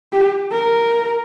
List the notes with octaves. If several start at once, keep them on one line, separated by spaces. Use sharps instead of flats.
G4
A#4